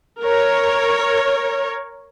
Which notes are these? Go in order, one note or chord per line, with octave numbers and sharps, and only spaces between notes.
A#4 C#5